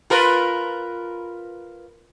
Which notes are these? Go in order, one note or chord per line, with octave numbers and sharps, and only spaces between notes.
F4 A#4 B4